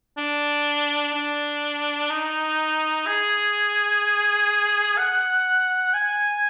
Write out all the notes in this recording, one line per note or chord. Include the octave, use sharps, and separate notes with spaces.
D4
D4
D#4
G#4
F#5
G#5